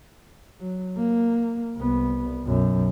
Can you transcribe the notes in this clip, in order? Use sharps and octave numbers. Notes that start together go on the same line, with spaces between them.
F#3
A#3
C2 B3
B1 F#2